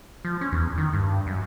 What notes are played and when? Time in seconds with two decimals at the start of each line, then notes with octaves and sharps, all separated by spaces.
0.25 F3
0.41 C#4
0.52 E2
0.78 D#3
0.93 G2
1.27 F#2